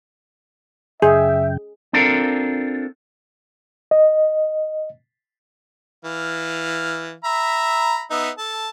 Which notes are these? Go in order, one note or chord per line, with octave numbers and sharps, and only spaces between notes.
F#2 C#3 G#4 E5 G5
C4 D4 F4 A4 A#4
D#5
E3 F5
E5 A#5 B5
B3 D#4 E5
A4 A5